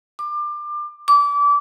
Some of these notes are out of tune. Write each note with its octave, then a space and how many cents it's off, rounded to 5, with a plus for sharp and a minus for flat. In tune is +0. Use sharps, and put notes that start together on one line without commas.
D6 +25
D6 -30